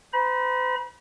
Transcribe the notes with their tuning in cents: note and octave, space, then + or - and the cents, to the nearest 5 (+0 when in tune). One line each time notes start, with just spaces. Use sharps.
C5 -45 B5 -45